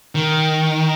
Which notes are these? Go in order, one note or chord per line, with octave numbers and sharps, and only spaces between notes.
D#3